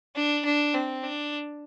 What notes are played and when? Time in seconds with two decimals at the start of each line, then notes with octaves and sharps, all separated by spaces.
0.16 D4
0.45 D4
0.74 C4
1.03 D4